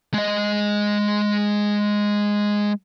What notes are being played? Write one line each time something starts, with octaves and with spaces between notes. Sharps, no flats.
G#3 D#5